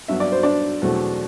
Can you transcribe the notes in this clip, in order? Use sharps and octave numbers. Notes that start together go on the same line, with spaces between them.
G2 F#3 B3 E5
D5
C5
D4 D5
E2 B2 F#3 A3 C4